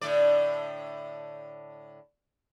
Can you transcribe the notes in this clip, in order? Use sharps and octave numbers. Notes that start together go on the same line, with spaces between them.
A2 D3 D5